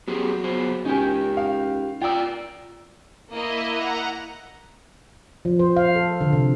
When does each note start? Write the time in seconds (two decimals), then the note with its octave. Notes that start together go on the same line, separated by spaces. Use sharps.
0.08 F#3 B3 G4 G#4
0.44 B3 G#4 C5
0.85 C#2 C#4 D#4 G4 G#5
1.37 F5
2.02 F4 D5 G5 E6
3.31 A#3 E4 D#5
3.68 F#5 A#5
5.45 F3
5.59 C5
5.76 F5
5.96 A4
6.21 D3
6.33 C3